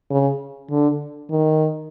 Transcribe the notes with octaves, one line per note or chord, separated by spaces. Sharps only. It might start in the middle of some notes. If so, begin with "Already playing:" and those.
C#3
D3
D#3